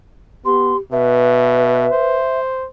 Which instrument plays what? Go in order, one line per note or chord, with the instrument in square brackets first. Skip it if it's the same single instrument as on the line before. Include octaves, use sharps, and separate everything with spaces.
[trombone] B3 [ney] G4 [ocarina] C6
[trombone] B2 [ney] B4 [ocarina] E5
[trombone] C5